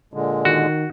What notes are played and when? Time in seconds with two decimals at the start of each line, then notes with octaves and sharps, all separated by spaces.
0.14 A#2 D3 G#3
0.45 D#3 F#4